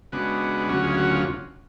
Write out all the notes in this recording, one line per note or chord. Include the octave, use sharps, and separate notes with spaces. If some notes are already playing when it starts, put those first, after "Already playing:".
C#3 G#3 B3 D4 F#4
D2 C#3 F#3 C#4 F#4
F4 G#4
F#4
F4